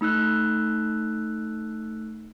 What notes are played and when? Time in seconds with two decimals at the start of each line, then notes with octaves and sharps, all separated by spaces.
0.01 A3 D#4 E6 F#6